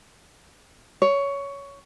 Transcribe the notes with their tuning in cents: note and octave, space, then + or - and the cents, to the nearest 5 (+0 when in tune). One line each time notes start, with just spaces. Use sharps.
C#5 +15